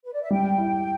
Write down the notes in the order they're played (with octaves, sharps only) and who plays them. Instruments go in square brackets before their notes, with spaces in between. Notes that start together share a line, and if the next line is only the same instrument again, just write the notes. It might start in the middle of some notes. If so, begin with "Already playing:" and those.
[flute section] B4
D5
E5
[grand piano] G3 [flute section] G5
[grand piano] E4